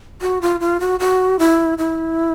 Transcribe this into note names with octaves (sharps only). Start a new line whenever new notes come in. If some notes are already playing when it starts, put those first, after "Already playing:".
F#4
F4
F4
F#4
F#4
E4
E4